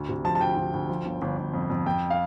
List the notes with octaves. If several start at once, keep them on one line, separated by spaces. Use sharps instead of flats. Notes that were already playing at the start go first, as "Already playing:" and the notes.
Already playing: D2
C3
F3 A5
A5
D2 G5
D2
D2
F3
G1
G1
G1
F2
F2
F2 G5
F5